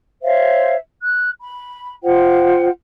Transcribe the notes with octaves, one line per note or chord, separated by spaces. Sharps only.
C5 C#5 E5 F5
F#6
B5
F4 C5 F#5 G5